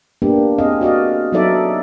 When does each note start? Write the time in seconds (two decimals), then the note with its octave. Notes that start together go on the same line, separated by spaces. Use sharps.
0.22 A#3 B3 D4 G4
0.58 C4 G#4 D#5 F5
0.81 F#4 D5 D#5 F5
1.32 F#3 B3 D#4 A4 D5 E5